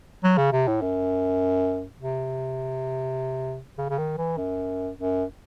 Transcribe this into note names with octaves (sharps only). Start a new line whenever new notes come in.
F#3
C#3
C3
A2
F#2
C3
C#3
C#3
D#3
E3
F#2
F#2